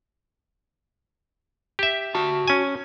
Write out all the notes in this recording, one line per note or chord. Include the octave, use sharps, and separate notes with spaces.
G4 E5
F#4 A5
C#4 G#5